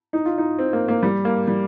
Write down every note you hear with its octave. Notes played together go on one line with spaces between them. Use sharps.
D#4
F4
D#4
C4
A#3
A#3
G3
A#3
G3